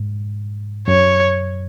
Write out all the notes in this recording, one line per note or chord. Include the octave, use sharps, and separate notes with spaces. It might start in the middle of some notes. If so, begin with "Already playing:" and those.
Already playing: G#2
F#2 C#5